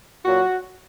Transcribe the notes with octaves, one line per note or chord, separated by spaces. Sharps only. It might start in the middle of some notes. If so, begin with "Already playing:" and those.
A#2 F#3 F#4